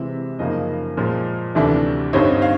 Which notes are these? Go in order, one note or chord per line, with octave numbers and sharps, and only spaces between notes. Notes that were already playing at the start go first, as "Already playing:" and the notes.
Already playing: C3 E3 G#3 C4 E4 E5
F#2 C#3 F3 A#3 D#4 D#5
A#2 F3 G#3
D2 C3 E3 A3 D4
G2 D3 G3 C4 D#4 C#5
F5